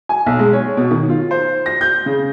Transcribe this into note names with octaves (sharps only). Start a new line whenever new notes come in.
G#5
B1
G#3
C#5
B2
D#3
F4
C5
A#6
G6
C#3